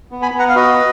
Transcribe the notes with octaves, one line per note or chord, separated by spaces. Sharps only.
B3
G#5 B5
B3
F#5 A#5
F5
F#4 B4 D#5